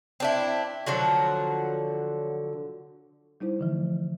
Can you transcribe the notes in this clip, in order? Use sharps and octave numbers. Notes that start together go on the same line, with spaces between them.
C4 D4 E4
D3 F3 F#3 F#4
G3 D#4 E4 C5
D3 E3 F3 A3